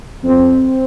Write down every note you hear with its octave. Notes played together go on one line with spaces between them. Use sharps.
F2 C4